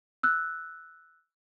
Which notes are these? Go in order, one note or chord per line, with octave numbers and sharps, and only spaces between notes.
E6 F#6